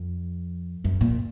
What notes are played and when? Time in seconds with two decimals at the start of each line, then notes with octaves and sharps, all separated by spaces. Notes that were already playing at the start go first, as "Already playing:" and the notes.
Already playing: F2
0.84 F#2
1.01 A#2